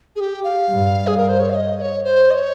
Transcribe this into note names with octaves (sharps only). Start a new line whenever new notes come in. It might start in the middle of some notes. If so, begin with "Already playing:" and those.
G#4
G4
F5
G2
G#4
A#4
C5
C#5
F5
D#5
D#5
C#5
C5
D#5
C#5